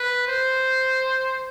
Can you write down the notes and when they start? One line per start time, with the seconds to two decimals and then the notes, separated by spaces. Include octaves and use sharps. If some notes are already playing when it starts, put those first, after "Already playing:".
Already playing: B4
0.27 C5